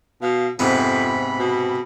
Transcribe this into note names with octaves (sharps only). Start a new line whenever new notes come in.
B2 F5
F2 G#2 C3 B3 B5
B2